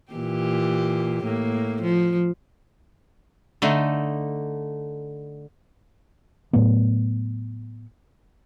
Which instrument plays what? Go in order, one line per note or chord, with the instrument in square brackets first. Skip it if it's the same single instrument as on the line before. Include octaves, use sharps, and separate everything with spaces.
[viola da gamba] A#2 E3 G4
A2 A#3
F3
[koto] D3 A3 D#4
[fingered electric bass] A2 F#3 A3 B3